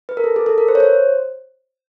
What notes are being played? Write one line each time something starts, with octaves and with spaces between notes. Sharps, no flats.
B4
A#4
A4
G#4
A4
A#4
C5
C#5
C5